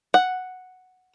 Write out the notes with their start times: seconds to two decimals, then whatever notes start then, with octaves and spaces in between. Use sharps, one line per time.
0.14 F#5